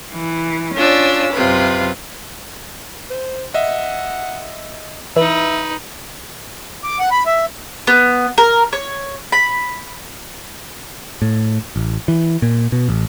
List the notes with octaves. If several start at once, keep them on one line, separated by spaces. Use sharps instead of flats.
E3
C#4 D4 F4 E6
F#2 C3 F4 B4
C5
D#5 E5 F#5
E3 D#4 B4 E5
D6
F#5
B5
E5
B3
A#4
C#5
B5
A2
A1
E3
A#2
B2
A1